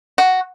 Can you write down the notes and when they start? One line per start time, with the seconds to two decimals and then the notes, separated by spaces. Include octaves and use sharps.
0.18 F#4